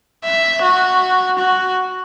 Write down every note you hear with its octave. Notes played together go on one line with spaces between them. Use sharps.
E5
F#4
F#4